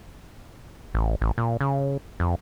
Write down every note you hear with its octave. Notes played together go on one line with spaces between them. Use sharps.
A1
A1
A#2
C#3
F2